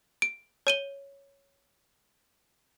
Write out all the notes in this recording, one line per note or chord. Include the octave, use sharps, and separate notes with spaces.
D7
C#5 D#7 G7